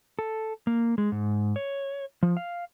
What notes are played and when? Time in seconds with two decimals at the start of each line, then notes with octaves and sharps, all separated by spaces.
0.19 A4
0.67 A#3
0.98 G#3
1.12 G#2
1.56 C#5
2.23 F3
2.37 F5